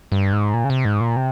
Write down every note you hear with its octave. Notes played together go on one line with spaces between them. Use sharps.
G2
G#2
A#2
C#3
C3
G#2
A#2
C3